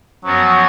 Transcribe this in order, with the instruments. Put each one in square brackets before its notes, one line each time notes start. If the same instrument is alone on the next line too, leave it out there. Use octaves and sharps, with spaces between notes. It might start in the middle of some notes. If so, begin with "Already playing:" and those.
[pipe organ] F#2 F3 B3 F#4 [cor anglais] F#3